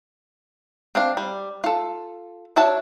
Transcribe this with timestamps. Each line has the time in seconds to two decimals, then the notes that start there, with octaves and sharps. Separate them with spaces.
0.95 C4 D4 F5
1.17 G3
1.64 F4 A4
2.56 D4 F#4 C#5 E5 A5